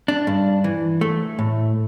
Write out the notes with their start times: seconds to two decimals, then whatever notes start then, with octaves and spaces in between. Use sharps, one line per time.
0.08 D4
0.27 G2
0.64 E3
1.01 A3
1.39 A2